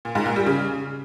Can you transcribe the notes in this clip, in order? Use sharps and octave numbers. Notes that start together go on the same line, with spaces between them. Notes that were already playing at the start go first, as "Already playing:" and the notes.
A#2
G#2
A#2
G3
C#3